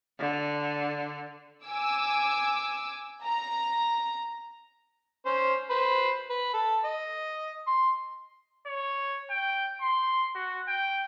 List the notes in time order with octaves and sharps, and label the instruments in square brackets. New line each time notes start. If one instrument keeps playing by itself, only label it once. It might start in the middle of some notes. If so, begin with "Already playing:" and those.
[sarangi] D3
[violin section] G#5 D6 E6
A#5
[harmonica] C#4 C5
B4 C5
B4
A4
D#5
C6
[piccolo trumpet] C#5
G5
C6
F#4
G5